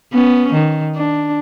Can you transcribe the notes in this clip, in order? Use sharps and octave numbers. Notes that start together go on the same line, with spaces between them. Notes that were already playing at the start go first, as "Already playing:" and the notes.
B3 C#4
D#3
D4